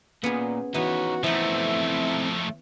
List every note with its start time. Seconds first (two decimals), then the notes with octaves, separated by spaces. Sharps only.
0.24 A#2 B3 C#4 G#4
0.74 E3 B3 D#4 F#4 C#5
1.24 E3 F3 A3 B3 C4 D#4 E4